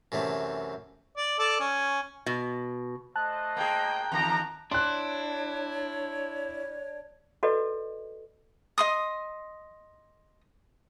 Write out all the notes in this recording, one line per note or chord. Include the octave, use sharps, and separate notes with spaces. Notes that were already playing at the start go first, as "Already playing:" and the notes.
F#2 C3 E3 A3
D5
A4 D5 D6
C#4
B2
A3 C5 D#5 A5 F#6
A#3 G#4 G5
E2 D#3 A#5
D4 E4 C#5 C6 F#6
F#4 A4 B4 D5 D#5
D#5 C6 D#6